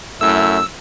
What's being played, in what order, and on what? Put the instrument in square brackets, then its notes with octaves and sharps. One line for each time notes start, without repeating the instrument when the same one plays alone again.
[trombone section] F#2 A3 E4 [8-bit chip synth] E6